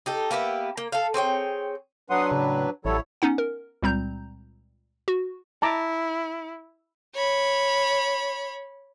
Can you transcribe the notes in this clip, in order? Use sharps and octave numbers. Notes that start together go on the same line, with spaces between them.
D#4 G4 A4
A#3 B3 G4 E5
A#3
A4 F5
C4 G#4 C#5 G5
F#3 D4 B4 F#5 C6 D#6
A2 C#3
A1 F#3 G3 E4 A4 C#5
B3 C#4 D#4 F#5
A#4
C#2 A#2 G3 C4 A#5 G6
F#4
E4 A5 A#5 D6
C#5 B5